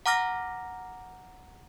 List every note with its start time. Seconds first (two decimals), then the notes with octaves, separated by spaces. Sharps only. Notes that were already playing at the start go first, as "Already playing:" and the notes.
0.06 F#5 A#5 D6 F6 A#6